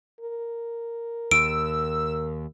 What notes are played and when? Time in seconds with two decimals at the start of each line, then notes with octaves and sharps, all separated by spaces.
0.21 A#4
1.31 D#2 E6 D7